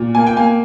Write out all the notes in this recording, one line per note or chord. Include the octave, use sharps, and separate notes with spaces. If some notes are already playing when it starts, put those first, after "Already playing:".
Already playing: A#2
A#3 G#5
G5
A#3 G#5